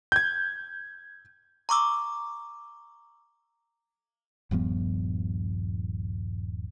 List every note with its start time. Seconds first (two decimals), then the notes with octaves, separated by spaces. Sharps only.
0.12 G6 G#6
1.69 A#5 C#6 D6 E6
4.51 D#1 G2 F3 B3